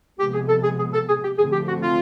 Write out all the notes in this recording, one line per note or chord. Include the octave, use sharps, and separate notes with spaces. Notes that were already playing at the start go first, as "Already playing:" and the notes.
C3 F3 G#3 B3 G4
G#4
A4
G#4
G#4
A4
G#4
G4
D3 F3 A3 C4 G#4
G4
F#4
F4